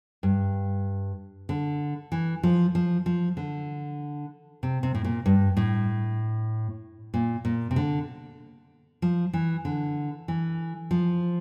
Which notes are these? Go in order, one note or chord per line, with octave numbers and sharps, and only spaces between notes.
G2
D3
E3
F3
F3
F3
D3
C3
C3
A2
A#2
G2
A2
A#2
A#2
C3
D3
F3
E3
D3
E3
F3